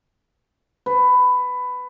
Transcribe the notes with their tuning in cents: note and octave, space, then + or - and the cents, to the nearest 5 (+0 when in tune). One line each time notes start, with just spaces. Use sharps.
B4 +15